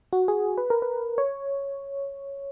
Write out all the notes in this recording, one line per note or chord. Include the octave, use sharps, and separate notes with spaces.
F#4
G#4
B4
A#4
B4
C#5